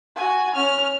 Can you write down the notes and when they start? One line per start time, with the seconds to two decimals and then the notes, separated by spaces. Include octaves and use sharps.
0.16 F#4 G#5
0.55 C#4 F6